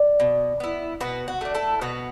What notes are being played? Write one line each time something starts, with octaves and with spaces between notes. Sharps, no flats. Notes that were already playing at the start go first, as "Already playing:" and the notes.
Already playing: D5
B2
B3 E4
B2 F#4 B4
F#4
A3 D4
E4 A4
B2 F#4 B4